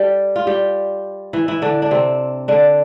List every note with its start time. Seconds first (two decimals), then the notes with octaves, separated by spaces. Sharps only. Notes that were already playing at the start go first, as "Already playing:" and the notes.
Already playing: G3 G4 A4
0.36 F4
0.47 G3 G4
1.33 E3 E4
1.48 E3 E4
1.62 D3 D4
1.82 D4
1.91 C3 C4
2.48 D3 D4